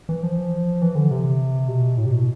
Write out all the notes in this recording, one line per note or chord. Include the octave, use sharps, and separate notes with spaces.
E3
F3
E3
D3
C3
B2
A2
C3
B2